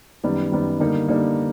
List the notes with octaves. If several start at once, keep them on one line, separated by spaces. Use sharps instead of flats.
F#2 D#3 G3 B3
F#2 D#3 G3 B3
D3 G3 A#3 D#4
D3 G3 A#3 D#4